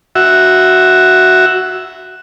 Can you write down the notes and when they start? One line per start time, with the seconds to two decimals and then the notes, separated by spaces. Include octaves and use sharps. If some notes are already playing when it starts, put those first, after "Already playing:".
0.15 F#4 E5